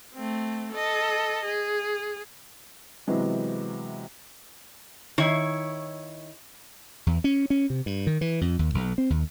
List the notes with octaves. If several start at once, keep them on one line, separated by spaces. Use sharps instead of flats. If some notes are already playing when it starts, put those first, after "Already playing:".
A3 C4
A4 D#5
G#4
C3 E3 F#3 G#3 B3
D#3 E4 C#5
E2
C#4
C#4
C3
G2
D#3
E3
F2
D#2
B1
C4
D#2